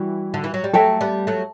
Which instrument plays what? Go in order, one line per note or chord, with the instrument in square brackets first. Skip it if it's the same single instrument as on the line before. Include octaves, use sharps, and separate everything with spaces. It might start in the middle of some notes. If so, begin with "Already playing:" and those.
Already playing: [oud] E3 G3 [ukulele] F#4
[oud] D3
E3
F#3
G3
[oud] F#3 A3 [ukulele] A4 E5 G5
[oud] G3 B3
F#3 A3